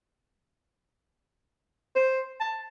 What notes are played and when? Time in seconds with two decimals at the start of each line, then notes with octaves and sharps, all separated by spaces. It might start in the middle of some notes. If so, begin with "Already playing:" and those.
1.96 C5
2.40 A5